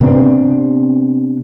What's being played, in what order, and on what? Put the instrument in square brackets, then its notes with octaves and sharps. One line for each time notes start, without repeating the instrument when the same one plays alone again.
[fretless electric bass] C3 B3 C4 D4